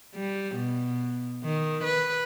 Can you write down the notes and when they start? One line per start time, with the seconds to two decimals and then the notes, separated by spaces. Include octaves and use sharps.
0.15 G3
0.55 B2
1.44 D#3
1.84 B4